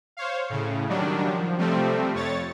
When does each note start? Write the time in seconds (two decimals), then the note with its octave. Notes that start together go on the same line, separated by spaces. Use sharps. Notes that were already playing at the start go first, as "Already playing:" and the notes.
0.17 C5 C#5 F5
0.50 A2 C#3
0.89 D#3 F#3 G3 D4
1.25 F3
1.58 C3 F3 G3 A3 C4
2.14 F2 C#5 A6